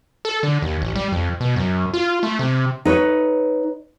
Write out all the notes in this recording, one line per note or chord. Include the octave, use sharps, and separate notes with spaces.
A4
D3
D#2
A1
G3
F2
B2
F#2
F4
A3
C3
D#4 B4 C#5